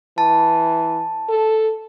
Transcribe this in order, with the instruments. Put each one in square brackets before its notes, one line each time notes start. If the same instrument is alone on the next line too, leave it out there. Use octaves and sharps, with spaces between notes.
[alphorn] E3 [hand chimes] A5
[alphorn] A4